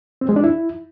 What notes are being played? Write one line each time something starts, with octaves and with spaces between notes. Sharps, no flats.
C4
G#3
D4
E4